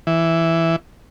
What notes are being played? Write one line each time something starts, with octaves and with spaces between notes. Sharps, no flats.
E3